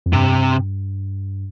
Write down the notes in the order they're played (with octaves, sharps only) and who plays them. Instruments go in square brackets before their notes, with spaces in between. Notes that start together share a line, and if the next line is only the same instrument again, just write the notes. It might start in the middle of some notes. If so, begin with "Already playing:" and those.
[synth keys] F2
[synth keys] G2 [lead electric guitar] C3